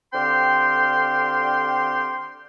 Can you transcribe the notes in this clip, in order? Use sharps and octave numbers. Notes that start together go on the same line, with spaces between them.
D3 C4 G4 F5 G5 C6